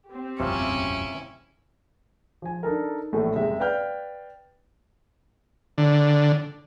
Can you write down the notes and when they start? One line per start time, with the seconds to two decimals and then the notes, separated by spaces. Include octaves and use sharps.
0.10 C4 G4
0.40 E1 A1 F#2 C3 C#4 E4 F4
2.42 F3 G#5
2.63 D4 D#4 A4 A#4
3.13 A#1 A2 E3 A3
3.36 F#1 C3 G#3 E5
3.60 B4 D5 F5 G5 F6 G6
5.78 D3